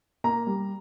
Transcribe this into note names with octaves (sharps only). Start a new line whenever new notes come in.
A#3 A#5
G3